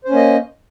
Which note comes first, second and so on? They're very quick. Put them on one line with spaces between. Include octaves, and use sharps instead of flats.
C5 C#4 A#3 D#5